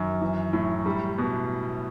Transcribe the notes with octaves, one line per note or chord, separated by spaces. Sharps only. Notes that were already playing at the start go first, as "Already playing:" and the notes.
Already playing: F#2 D#3
E3
A2
G3
B2